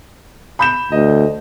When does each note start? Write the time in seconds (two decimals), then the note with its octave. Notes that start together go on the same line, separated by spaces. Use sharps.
0.59 B5 G6 E7
0.92 D2 D#5